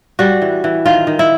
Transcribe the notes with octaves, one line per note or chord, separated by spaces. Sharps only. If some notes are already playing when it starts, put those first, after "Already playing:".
G3 F#4
E3
E3
D#3 F4
D#3
E4